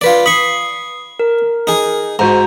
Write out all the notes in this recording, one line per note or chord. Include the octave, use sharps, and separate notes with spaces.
F4 B4 D5
B5 C#6 D#6 C7
A#4
D#4 G#4
G#2 F#4 C5 A#5